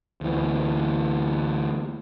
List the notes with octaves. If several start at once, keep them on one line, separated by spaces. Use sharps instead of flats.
D2 E3